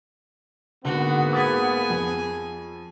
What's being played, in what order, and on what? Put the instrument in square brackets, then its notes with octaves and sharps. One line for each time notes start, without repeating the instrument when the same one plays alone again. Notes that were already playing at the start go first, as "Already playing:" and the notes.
[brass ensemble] G#2 A#3 B3 [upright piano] D3 [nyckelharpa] F#4
[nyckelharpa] G#4 G#5 [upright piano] D#6 A6 B6
[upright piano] F2